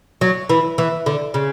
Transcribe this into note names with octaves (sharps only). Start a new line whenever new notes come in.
F#3
E3
E3
D3
C#3